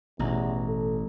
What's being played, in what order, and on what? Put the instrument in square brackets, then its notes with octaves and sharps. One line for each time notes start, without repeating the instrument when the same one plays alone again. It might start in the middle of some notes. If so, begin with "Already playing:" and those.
[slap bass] A1 [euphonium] E2 [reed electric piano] B2 A#5
[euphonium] A4